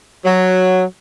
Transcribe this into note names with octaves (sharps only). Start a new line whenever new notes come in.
F#3